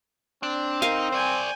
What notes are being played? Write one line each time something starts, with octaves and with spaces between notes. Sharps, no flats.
C4 D4
D#4 A#4 F5
C5 D5 G5 G#5